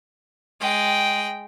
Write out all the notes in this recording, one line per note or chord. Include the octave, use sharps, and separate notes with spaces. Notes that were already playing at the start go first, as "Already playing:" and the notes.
G#3 G5